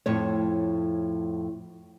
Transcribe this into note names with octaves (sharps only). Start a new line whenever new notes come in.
F2 A2 C#5